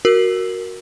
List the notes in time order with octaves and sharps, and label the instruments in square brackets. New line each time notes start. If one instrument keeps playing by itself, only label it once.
[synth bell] F#4 A#4 E6 C7 F#7